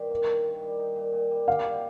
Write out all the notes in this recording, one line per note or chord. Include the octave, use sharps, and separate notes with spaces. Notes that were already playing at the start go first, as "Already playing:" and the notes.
Already playing: G2 D#3 G3 G4
A#3
D#3
D#3
G3
D#4
A#2
A#2
G3
G4 F5
G3